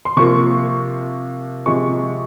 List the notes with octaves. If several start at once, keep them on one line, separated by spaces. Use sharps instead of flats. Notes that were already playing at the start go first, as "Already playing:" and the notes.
C6
C3 F3 A#3 C#6
C3 F3 G#3 C#6